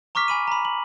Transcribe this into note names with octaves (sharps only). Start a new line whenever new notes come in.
A#5 C#6 D6 F6 B6
G#5 B5 D#7
A#5 B5
F#7